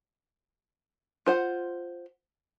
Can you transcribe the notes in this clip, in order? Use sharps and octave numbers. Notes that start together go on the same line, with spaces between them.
F4 C5 F#5